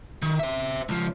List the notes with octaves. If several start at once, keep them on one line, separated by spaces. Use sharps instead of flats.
D#3
C5 E5
C#2 F3